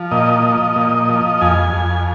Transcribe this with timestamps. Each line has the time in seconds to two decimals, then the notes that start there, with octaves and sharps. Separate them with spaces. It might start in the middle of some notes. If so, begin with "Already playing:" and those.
Already playing: F3
0.11 A#2 D#5
0.43 F3
0.76 A#2
1.09 F3
1.41 F2 G#5
1.73 F2